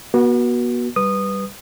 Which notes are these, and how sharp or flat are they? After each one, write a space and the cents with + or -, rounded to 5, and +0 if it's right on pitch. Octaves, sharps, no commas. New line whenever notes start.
B3 -40 F#4 +0
G3 +0 B4 +0 D#6 -15